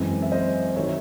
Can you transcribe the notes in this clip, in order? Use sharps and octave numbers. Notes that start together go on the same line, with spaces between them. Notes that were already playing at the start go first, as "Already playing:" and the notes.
Already playing: F#2 E3 G#3 C4
E5
C5 D#5
D#3 F#3 C#5 E5